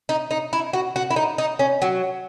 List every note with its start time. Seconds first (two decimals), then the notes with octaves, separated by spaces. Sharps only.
0.09 D#4
0.31 D#4
0.53 E4
0.73 F#4
0.96 F#4
1.10 E4
1.16 D#4
1.38 D#4
1.59 C#4
1.82 F#3